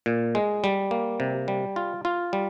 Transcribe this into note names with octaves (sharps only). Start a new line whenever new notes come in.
A#2
G#3
G3
A#3
C3
G3
F4
F4
G3